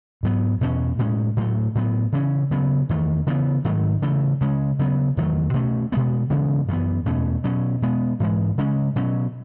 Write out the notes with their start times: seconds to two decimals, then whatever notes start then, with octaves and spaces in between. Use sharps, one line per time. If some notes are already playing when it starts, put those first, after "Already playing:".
0.23 G#2 F#3 B3
0.61 E2 B2 A3 C#4
0.99 A2 G#3 C#4
1.37 A2 F#3 A3
1.75 A2 F#3 B3
2.12 C#3 E3 A3 C#4
2.51 C#3 F#3 B3
2.89 E2 D#3 A3
3.27 C#3 E3 B3
3.65 G#2 D#3 F#3 A3
4.02 C#3 E3 A3
4.41 C#3 G#3 C#4
4.79 C#3 F#3 B3
5.17 E2 D#3 F#3 A3
5.54 B2 A3 C#4
5.92 B2 G#3 B3
6.30 C#3 E3 G#3 B3
6.68 F#2 E3 B3
7.06 E2 B2 A3 C#4
7.44 B2 F#3 C#4
7.82 B2 G#3 B3
8.20 G#2 E3 G#3
8.58 C#3 G#3 C#4
8.96 B2 F#3 C#4